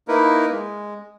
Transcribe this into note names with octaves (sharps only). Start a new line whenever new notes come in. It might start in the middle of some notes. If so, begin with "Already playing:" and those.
A#3 D#4 E4 A#4 B4
G#3